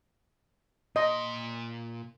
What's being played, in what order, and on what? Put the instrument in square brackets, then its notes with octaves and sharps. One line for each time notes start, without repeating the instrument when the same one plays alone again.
[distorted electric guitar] A#2 C6 [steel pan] D#5